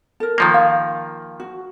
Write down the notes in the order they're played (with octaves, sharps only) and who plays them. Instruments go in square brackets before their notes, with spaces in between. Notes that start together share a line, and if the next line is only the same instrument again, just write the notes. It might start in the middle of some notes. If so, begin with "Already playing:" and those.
[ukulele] A4 A#4
[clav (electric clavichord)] D#3 F3 A#3
[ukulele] F5
F#4